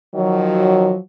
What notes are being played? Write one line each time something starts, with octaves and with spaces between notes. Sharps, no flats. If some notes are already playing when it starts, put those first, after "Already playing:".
D#3 F3 F#3